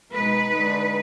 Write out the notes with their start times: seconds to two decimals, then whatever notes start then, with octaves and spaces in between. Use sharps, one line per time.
0.14 B2 G#3 D#4 B4
0.53 D3 G#3 D#4